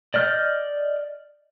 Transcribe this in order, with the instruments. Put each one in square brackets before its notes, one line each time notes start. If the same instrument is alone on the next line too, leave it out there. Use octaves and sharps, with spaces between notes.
[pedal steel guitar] D5 D#5 F6 G6